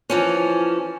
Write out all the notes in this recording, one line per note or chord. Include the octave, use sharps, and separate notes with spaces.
E3 F3 C#4